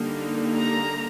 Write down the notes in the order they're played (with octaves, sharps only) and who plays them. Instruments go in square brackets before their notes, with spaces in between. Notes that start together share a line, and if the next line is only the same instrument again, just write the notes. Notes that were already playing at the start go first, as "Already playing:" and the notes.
Already playing: [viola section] D3 G3 A#3 D#4
A#5